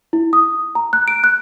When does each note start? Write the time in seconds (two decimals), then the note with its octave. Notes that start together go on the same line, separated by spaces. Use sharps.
0.13 E4
0.33 D#6
0.75 A#5
0.93 F#6
1.08 D7
1.24 F#6